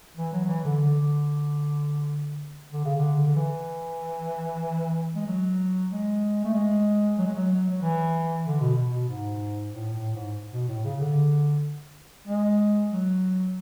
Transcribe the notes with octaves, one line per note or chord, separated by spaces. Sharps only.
E3
F#3
F#3
E3
D3
D3
D3
C#3
D3
D3
E3
G#3
F#3
G#3
A3
G#3
F#3
G#3
F#3
F#3
E3
D3
B2
B2
B2
G#2
A2
A2
G#2
B2
A2
C#3
D3
G#3
F#3